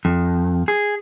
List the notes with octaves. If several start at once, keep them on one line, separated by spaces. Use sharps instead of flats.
F2
G#4